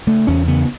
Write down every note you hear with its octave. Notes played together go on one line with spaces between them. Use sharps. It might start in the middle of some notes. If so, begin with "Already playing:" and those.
C#3 A3
E2 C#4
C#3 B3